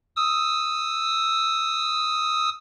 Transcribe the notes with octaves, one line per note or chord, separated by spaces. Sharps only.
D#6 E6